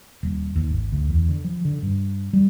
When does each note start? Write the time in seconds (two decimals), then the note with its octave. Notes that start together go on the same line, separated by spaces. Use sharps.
0.23 D#1
0.56 D#2
0.70 G#1
0.92 D2
1.09 E2
1.29 D3
1.45 F3
1.65 D3
1.82 G2
2.33 G3